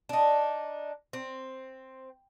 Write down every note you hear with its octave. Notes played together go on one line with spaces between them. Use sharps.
D4 D#4
C4